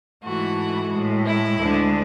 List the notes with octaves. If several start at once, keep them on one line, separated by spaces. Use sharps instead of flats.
G#2 E3 A3 F#4
A2 G#3
E4
D2 D3 G#3